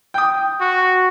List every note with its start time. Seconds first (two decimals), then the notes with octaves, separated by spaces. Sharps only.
0.14 G5 D#6
0.60 F#4